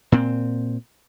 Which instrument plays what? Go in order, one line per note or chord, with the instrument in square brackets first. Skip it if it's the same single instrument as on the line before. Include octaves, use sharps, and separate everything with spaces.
[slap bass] A#2 C4